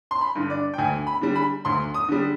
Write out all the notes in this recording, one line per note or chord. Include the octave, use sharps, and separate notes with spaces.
C6
B5
G2 D3
D5
G5
D2 G#5
B5
D3 G3
B5
D2 C6
D#6
D3 G3